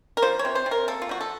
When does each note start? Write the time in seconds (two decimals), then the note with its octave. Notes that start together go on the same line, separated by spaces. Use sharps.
0.17 A#4
0.22 F3 C5
0.39 C#5
0.45 C3
0.55 C5
0.66 C3
0.71 A#4
0.88 A#3 A4
1.02 F4
1.09 F3 F#4
1.21 A4